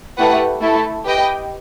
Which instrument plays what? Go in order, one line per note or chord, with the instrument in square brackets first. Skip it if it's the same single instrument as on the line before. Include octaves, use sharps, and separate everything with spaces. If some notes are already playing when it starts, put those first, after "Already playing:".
[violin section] A3 E4 G4 B4 F#5
A3 E4 A4
G4 B4 D#5 G5